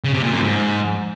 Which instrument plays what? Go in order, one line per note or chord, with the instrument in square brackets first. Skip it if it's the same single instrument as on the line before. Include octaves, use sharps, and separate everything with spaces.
[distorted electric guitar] C#3
C3
A#2
F#2
G#2